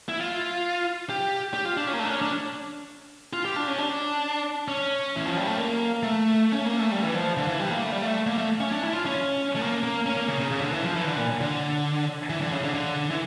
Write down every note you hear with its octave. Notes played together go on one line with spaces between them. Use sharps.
E4
F4
G4
G4
F4
D4
C#4
A#3
A3
D4
C#4
D4
F4
G4
D4
C#4
D4
C#4
E3
F3
G3
A3
A#3
A3
C#4
A#3
A3
G3
E3
F3
D3
E3
G3
A#3
A3
G3
A3
A#3
A3
C#4
D4
E4
F4
C#4
A3
A#3
A#3
C#4
A#3
C#3
C#3
C#3
D3
E3
F3
E3
D3
A#2
D3
E3
D3
C#3
D3
D3
E3